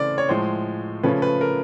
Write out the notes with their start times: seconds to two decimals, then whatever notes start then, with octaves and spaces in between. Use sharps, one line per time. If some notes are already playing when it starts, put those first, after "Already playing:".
Already playing: C#3 E3 A3 C4 D5
0.18 C#5
0.29 A2 F3 G#3 C5
1.03 C#3 F3 A3 C#4 B4
1.22 B4
1.41 A#4